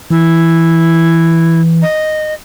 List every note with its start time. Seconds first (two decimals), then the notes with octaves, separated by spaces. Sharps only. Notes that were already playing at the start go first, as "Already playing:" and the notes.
0.10 E3 E4
1.82 D#5